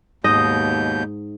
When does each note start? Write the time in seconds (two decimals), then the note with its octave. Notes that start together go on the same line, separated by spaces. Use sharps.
0.24 D#2 G#2 B2 D#5 G6